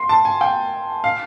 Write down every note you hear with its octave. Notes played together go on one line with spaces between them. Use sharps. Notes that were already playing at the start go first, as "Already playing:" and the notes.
Already playing: C6
A5
G#5
G5
F5